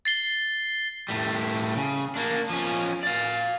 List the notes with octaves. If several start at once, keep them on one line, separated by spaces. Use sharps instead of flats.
A6 C7 G7
A2 G3
C#3
A#3 D4
F3 C#4
D5 F5